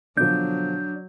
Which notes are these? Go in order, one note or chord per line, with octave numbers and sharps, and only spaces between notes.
B2 D3 F3 F#3 D4 G6